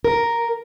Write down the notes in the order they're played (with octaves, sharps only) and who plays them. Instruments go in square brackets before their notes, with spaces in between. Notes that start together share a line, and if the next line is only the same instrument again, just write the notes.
[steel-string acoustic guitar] A#4